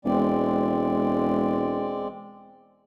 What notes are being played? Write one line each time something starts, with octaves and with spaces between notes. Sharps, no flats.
E1 G#3 C4 D5